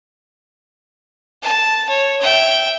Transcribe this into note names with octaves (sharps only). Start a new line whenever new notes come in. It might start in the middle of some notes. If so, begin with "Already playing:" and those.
A5
C#5
E5 G5